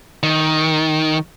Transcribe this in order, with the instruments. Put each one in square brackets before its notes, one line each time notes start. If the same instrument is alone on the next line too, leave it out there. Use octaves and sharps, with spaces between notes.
[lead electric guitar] D#3